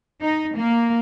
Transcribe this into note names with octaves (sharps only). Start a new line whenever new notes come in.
D#4
A#3